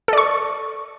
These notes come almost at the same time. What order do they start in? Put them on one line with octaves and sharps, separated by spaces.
A4 D5 C#6